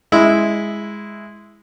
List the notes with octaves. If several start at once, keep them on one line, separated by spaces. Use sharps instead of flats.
G#3 E4